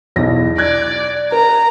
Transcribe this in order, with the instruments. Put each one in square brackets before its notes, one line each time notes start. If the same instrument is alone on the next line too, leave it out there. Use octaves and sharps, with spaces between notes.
[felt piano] B1 E2 A#6
[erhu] D5 [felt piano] F#6 G#6
[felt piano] A#4 [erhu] A#5